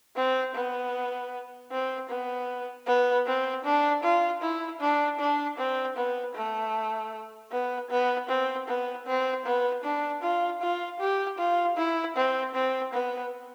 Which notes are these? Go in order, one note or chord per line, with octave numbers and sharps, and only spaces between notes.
C4
B3
C4
B3
B3
C4
D4
F4
E4
D4
D4
C4
B3
A3
B3
B3
C4
B3
C4
B3
D4
F4
F4
G4
F4
E4
C4
C4
B3